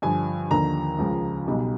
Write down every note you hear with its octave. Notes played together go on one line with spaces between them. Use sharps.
G2 D3 F3 G#5
D#2 D3 F3 A#5
C#2 C#3 F3
B1 B2 G3